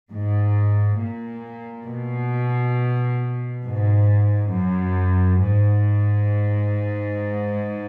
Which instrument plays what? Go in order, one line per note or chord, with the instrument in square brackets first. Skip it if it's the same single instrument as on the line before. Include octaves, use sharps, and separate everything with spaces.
[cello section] G#2
A#2
B2
G#2
F#2
G#2